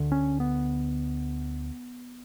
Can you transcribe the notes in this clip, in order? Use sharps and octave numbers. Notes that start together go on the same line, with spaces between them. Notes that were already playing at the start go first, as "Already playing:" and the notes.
Already playing: D2 D3
C#4
B3